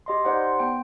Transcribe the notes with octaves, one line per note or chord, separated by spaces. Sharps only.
G4 D#5 C6
D#4 G4 C5 D5 F#5
C6
B3 G5 D7